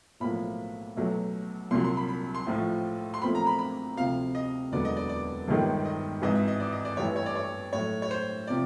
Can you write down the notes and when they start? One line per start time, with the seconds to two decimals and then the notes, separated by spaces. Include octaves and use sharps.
0.20 B1 A2 F3 A#3 B5
0.97 B1 B2 F#3 A3
1.71 C2 A#2 F#3 C6
1.84 C6
1.97 B5
2.09 B5
2.35 C6
2.46 A#1 A2 F3
3.14 C6
3.22 B1 A#2 F3 A3 C4 B5
3.35 A#5
3.47 B5
3.59 B5
3.97 D2 C3 F3 F5
4.35 D#5
4.72 E1 D2 D3 F#3 B3 D5
4.85 D#5
4.97 D5
5.09 D5
5.48 G1 G2 D#3 G#3
5.85 D#5
6.22 G#1 G#2 E3 D#5
6.35 E5
6.48 D#5
6.60 D5
6.73 D#5
6.85 D5
6.97 A1 G2 E3 C#5
7.16 C#5
7.26 D5
7.35 C#5
7.73 A2 F#3 A3 C#5
8.02 C#5
8.11 C5
8.47 C3 F3 D5